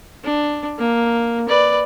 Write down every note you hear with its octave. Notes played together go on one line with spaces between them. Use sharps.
D4
A#3
B4 D5